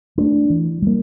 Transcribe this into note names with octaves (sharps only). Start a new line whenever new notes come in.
A3 D4
E3
G3 A#3